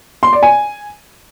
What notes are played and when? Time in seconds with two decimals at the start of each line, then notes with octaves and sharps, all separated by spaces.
0.23 C6
0.33 D5
0.43 G#5